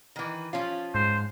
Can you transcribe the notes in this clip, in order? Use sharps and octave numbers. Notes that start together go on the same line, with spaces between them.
D#3 E3
F3 C#4 F4
G#2 C5